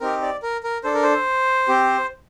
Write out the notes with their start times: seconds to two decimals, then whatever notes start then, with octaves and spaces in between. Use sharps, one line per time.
0.01 C4 D#4 G4 A#4
0.22 D5
0.43 A#4
0.63 A#4
0.84 D4 A4 C5
0.94 A#4
1.03 C5
1.68 C4 G4